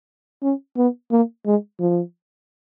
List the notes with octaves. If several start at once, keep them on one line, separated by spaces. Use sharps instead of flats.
C#4
B3
A#3
G#3
F3